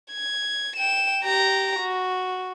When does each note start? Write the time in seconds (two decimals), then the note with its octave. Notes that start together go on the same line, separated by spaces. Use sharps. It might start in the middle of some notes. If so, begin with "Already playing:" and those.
0.11 G#6
0.76 G5 E7
1.23 G4 A#5
1.79 F#4